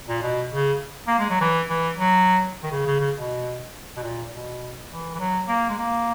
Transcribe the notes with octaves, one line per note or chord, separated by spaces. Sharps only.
A#2
B2
C#3
A#3
G#3
F#3
E3
E3
F#3
D#3
C#3
C#3
C#3
B2
B2
A#2
B2
E3
E3
F#3
A#3
G#3
A#3